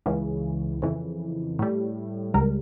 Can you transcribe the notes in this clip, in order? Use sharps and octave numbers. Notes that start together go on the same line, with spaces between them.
C#2 C#3 E3
F2 C#3 E3
A2 G3
C#2 C#3 G3 A#4